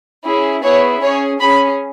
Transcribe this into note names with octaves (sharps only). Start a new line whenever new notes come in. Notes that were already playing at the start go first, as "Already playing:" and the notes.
C#4 E4 G#4
B3 E4 G#4 C#5
C#4 G#4 C#5
C#4 G#4 B5